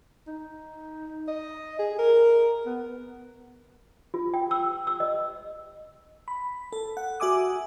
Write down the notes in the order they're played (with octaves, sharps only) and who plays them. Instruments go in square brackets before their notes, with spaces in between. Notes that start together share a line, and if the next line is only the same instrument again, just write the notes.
[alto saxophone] D#4
D#5
G#4
A#4
B3
[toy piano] F4
G5
E6
E6
D#5
[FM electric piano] B5
A4
F#5
F#4 E5 G#5 D6 D#6